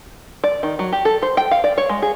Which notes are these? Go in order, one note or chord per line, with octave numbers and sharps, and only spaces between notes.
D5
D#3
F#3
G4
A4
C5
G5
F5
D5
C#5
G#3
G#4